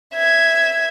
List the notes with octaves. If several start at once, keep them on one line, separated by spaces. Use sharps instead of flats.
E5 G#6